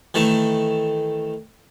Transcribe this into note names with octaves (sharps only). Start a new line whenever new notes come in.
D#3 E3 A3